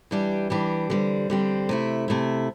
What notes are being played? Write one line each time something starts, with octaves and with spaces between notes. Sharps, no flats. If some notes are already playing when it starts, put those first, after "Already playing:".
E3 G3 D4 G4
E3 G3 D4 G4
D3 G3 C4
D3 G3 C4
C3 A3 E4
C3 A3 E4